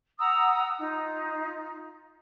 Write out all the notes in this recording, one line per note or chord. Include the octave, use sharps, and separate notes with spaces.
F#5 A#5 D#6 E6
D#4 F4